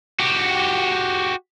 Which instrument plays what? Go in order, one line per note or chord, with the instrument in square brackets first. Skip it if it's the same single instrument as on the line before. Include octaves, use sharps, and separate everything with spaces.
[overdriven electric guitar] F#4 G4